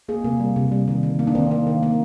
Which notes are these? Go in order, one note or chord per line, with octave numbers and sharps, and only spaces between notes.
A#3 G#4
C3 A#3
G3
C3
G3
D#3
D#3
A#3
D4
D#3 C4
A#3
D#3
A#3